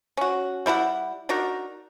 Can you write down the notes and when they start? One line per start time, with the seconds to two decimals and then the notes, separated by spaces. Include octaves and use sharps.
0.17 C#4 F#4
0.66 G3 E4 A#4 F#5
1.29 D4 D#4 F#4 A#4